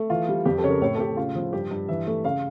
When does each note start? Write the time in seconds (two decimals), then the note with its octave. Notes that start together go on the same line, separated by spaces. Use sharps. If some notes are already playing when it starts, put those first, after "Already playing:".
Already playing: A3
0.10 E3 F4
0.29 G3
0.45 F2 G4
0.58 A4
0.64 C#3 C#5
0.70 A#4
0.82 A2 C#5
0.95 A4
0.99 A2 G4
1.17 C#3 F4
1.35 F3
1.53 G2 G4
1.71 G2
1.89 E3 E5
2.07 A3
2.25 C#3 F5